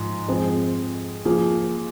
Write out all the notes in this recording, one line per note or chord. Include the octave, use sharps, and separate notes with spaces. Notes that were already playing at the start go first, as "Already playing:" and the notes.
Already playing: G#2 F3
F2 F3 G#3 C4 G#4
F3 A#3 F4 G#4